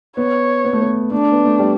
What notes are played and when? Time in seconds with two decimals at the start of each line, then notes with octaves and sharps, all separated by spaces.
0.17 B3 C#5
0.65 B3
0.73 A3
0.81 B3
1.12 A3 D4
1.32 B3
1.45 A3
1.59 G3